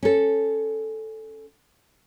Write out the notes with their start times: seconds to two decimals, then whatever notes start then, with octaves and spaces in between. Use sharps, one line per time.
0.03 C#4 A4